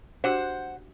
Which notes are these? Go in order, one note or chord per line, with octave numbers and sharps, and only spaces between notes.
D4 F#4 G4 C5 F#5